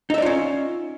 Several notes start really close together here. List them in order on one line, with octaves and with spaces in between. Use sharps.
D#4 E5 D5 F4 C#4